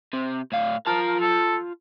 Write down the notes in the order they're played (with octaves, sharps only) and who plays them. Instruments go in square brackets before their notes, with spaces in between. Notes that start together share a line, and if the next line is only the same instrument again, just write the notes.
[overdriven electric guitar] C3
A2 F5
[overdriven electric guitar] F4 A5 [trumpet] A#4
[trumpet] A4